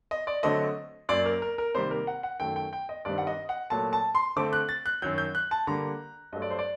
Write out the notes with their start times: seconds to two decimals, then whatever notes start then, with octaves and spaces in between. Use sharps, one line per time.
0.11 D#5
0.27 D5
0.43 D3 F#3 A3 C4 D#5
1.09 F#2 F#3 A#3 D5
1.26 A#4
1.42 A#4
1.58 A#4
1.75 C3 D#3 G3 A#3 C5
1.91 A#4
2.07 F#5
2.23 F#5
2.40 F#2 D#3 A3 G5
2.56 G5
2.73 G5
2.89 D#5
3.05 G2 D#3 G3 C4 D5
3.18 F#5
3.27 D#5
3.49 F#5
3.70 A#2 F#3 A3 A5
3.93 A5
4.15 C6
4.36 D3 A3 C4 D6
4.53 F#6
4.69 A6
4.86 F#6
5.02 F#2 D#3 F#3 G6
5.18 G6
5.35 F#6
5.51 A5
5.67 D3 G3 A#3 A#5
6.33 G2 F#3 A3 D#5
6.42 D5
6.50 C5
6.59 D5